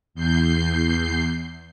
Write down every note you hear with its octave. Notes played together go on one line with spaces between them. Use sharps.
E2 G6 C7